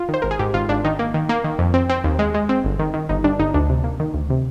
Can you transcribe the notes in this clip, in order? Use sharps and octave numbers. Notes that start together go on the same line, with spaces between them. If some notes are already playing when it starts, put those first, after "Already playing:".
Already playing: F4
D#3
C5
G#1 A#4
G#4
G#2 G4
G#1 F4
G#1 D4
D#3 D#4
A#3
D#3
A#3
D#3
F2
C4
C4
D#2
G#3
G#3
C4
G1
D#3
D#3
G1 D#4
G2 D4
G1 D#4
D2 D4
C3
A#3
D#3
D2
C3